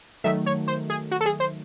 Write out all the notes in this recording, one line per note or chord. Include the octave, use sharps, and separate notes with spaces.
D#3 F#3 A3 E5
C#5
C5
G#4
F#4
A4
G#4
C5